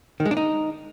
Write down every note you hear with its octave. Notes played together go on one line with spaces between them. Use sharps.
D#3
G#3
D4
D#4